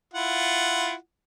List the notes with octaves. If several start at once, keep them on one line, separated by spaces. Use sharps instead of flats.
E4 F4 F#5